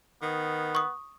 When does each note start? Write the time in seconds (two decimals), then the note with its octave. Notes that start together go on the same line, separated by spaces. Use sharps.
0.22 D#3 B3
0.75 C#6 D#6